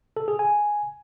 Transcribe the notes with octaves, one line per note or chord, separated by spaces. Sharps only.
A4
G#4
G#5